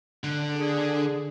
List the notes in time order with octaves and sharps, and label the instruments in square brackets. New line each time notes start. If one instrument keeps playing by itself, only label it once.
[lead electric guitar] D3
[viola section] D4 G#4